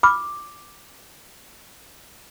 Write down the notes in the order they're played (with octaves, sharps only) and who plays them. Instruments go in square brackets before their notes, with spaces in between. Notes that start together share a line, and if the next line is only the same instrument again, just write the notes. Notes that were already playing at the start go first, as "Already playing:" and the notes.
[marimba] B5 F6 [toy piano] D6